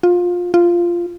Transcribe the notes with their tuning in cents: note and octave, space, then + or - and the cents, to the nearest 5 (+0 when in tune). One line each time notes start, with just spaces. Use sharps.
F4 +20
F4 -10